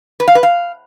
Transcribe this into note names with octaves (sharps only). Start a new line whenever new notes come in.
B4
F5
B4
F5